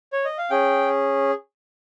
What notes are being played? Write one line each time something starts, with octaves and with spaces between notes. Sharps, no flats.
C#5
D#5
F5
C#4 G#4 G5